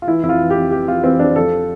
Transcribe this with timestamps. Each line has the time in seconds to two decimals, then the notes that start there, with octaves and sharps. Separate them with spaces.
0.02 F4
0.07 E3 E4
0.23 F2 E4
0.29 F4
0.39 E3
0.50 G4
0.56 F2
0.71 E3 G4
0.88 F2 F4
1.03 E3 C4
1.19 F2 D4
1.36 F3 A4